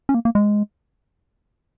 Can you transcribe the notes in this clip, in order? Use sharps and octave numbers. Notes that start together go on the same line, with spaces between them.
C#4
A#3
A#3
G#3